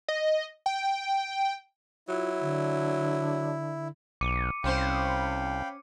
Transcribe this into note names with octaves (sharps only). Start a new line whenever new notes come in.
D#5
G5
F#3 E4 F4
D3
B1 D6 C#7 D#7
C2 C#4 C5 F5 G5 B5